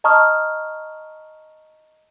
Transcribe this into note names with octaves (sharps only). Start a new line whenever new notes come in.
D#5 A5 A#5 C#6 D#6 F6